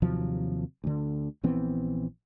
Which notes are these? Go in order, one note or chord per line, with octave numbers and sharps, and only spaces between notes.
D#2 C3 F3 F#3
D2 D3
A#1 E3 B3 C4